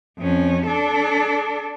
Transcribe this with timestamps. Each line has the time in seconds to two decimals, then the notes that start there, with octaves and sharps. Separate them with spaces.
0.18 F2 C#4
0.66 D4 A4